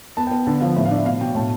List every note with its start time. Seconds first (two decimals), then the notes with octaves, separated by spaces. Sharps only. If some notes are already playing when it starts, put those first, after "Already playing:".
0.17 B3 A5
0.27 G5
0.31 B3
0.46 D3 A5
0.61 F3 F5
0.76 A2 E5
0.86 F5
0.91 D4 E5
1.05 B2 F5
1.21 B2 G5
1.35 A2 A5